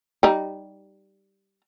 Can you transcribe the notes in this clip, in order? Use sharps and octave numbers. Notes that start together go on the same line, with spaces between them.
G3 D#4